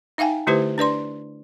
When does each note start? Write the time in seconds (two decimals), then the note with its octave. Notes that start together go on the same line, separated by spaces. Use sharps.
0.18 D#4 E5 F5 G5 G#5
0.47 D3 A3 E4 G4 B4 C5
0.78 D4 B4 D5 C6